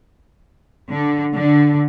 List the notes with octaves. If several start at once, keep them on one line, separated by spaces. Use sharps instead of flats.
D3
D3